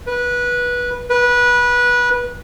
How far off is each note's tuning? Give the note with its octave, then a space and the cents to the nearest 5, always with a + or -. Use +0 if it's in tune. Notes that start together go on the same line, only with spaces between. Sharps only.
B4 -20
B4 -20